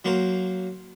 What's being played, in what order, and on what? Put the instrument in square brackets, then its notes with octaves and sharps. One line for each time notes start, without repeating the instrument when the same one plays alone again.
[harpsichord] F#3 A#3 A#4 C5